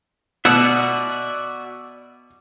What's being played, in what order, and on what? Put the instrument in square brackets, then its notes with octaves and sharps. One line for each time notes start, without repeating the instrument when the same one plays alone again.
[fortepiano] B2 [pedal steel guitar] F#4 D5 E5 [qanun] F#5